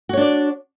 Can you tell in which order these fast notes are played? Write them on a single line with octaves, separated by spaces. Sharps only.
F#4 C#5 D4 D5